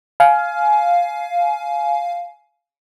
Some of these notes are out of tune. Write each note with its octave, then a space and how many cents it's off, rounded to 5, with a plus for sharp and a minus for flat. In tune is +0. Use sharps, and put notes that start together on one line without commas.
F5 +0 G#5 +25